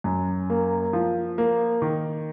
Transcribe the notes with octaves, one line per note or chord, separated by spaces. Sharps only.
F#2
A#3
F3
A#3
D#3